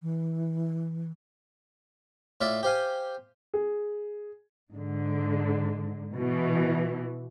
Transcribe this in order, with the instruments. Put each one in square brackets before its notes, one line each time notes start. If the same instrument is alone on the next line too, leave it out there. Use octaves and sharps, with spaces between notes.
[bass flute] E3
[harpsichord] A2 F4 D5 E5
G4 C5 F5 G#5
[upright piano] G#4
[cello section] G#2 D3
B2 E3